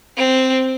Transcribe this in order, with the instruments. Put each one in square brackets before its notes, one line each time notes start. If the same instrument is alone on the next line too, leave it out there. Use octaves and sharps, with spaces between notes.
[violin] C4